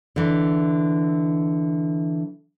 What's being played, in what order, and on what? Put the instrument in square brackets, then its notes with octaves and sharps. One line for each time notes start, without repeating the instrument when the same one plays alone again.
[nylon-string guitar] D3 E3